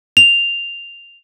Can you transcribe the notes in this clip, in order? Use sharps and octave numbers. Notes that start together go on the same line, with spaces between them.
F7